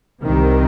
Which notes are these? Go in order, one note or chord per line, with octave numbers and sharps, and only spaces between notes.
C2 C3 D#3